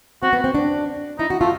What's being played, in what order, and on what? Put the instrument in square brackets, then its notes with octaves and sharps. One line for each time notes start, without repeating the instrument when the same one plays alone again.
[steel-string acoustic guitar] C4 [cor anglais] F#4
[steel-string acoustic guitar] B3
C4
D4
[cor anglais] D#4 [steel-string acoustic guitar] E4
[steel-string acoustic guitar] F#4
[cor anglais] A3 [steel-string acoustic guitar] F4